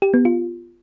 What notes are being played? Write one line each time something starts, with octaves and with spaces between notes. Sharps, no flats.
G4
B3
F4